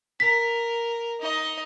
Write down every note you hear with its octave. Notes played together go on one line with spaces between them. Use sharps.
A#4 B6
D#4 D#5